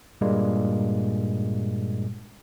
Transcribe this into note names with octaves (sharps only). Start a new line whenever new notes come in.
G2 A#2 G3 G#3 A#3